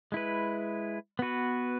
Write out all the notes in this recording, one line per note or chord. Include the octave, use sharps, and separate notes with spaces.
G#3 E4 B4
B3 F#4 B4